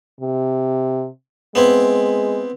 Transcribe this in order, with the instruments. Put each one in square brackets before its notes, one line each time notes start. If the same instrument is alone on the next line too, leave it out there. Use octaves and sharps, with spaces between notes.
[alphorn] C3
[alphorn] G#3 [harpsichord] B3 C4 E4